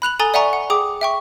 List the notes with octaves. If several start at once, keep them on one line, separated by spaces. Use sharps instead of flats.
B5 F#6 F7 F#7
A4 G#5 A#5 D#6 A6 G7
D5 E5 F#5 G#5 A#5 C#6
F#5
G#4 G5 D6 D#6
E5 G5 C#6